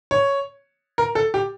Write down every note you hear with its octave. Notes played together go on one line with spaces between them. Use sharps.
C#5
A#4
A4
G4